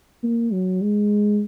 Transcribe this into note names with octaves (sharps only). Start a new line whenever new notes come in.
A#3
F#3
G#3